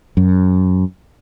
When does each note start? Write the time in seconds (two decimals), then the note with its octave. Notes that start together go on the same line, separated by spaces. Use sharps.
0.17 F#2